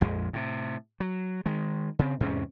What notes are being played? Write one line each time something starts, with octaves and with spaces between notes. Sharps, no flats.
A#1 F2 G#3
A2 C3
F#3
D#3 G#3
C#3 C4
E2 G#2 C3 C#4